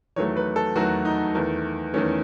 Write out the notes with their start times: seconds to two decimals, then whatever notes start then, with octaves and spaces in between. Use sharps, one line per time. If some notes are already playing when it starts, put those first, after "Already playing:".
0.16 E2 D#3 F#3 A3 C#5
0.37 B4
0.56 A4
0.75 E2 D#3 F#3 A3 F#4
1.05 D#4
1.35 E2 D#3 A3
1.94 E2 D#3 A3 C#4